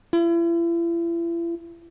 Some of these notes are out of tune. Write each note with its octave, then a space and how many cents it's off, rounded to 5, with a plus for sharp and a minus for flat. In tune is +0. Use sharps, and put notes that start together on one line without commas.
E4 +40